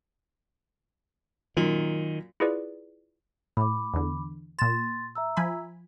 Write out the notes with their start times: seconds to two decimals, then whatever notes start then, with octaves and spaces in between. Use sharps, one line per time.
1.57 F#2 A#2 D#3
2.40 E4 F4 G#4 B4 D5
3.57 A2 B5 D6
3.94 E2 D3
4.59 A#2 C6 A6 E7
5.15 E5 A#5 E6
5.37 F3 G#5 B5